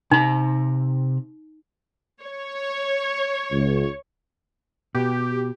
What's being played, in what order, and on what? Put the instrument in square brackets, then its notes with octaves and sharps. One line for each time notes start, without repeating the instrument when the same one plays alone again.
[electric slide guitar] C3 A#5 [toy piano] D#4
[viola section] C#5
[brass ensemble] C#2
[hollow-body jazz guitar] B2 [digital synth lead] G4